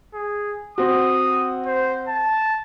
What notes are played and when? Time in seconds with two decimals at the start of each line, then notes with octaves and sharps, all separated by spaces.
0.14 G#4
0.78 C4 F#4 D#6
1.66 C5
2.08 A5